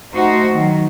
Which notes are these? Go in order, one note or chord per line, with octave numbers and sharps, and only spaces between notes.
A3 D#4 F#4 C5
D#3 F#3